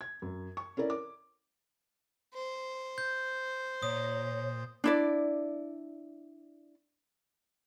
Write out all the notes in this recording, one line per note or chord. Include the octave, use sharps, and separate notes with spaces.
G#6
F#2
C#6
C#4 E4 A#4 D5
D6
C5
G6
A#2 C#5 D#6
D4 E4 D5